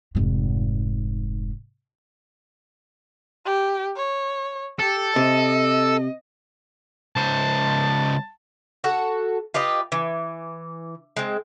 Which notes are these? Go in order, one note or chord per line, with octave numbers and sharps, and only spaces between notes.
F1 G#2
G4
C#5
G4 A4
C3 D#5
C#2 C5 A5
F#4 A4 F#5
F4 G4 B4 D#5
E3
G#3 C4